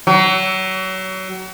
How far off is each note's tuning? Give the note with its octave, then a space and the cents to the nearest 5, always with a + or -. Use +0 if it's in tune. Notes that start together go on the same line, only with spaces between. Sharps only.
F#3 +30